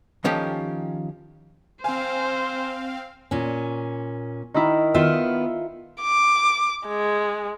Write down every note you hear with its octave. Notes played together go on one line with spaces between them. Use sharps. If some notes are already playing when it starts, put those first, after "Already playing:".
D#3 F3 C#4 G4 A4
C4 C5 F5 G#5
A#2 C#4
D#3 D#4 E4
D#3 B3 F4 E5
D6
G#3